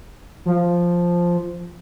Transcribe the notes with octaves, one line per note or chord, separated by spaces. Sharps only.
F3